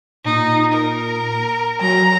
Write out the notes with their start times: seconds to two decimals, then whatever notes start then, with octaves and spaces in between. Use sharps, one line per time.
0.25 A#2 D#4
0.73 A#4
1.81 F#3 A#5